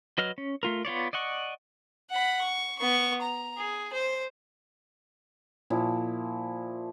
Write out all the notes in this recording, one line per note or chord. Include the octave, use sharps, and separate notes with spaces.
F#3 B4 D#5 F6
C#4
A3 F4 A#4
B3 F4 C#5 D5
D5 D#5 F#5 C#6
F#5 B5
C#6
B3 C#6
A#5
G#4
C5
A#2 F3 E4